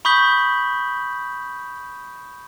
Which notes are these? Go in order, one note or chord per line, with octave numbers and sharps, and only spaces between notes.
B5 C#6 D#6 G6 B6 F#7